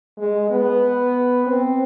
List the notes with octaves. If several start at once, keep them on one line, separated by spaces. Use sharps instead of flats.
G#3
B3
C4